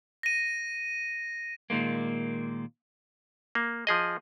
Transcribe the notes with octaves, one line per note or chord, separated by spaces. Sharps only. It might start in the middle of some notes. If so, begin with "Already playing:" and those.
A#6 D#7
A#2 D#3 G#3 A#3
A#3
F3 G#4 D#5